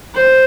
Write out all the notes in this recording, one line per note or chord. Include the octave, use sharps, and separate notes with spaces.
C5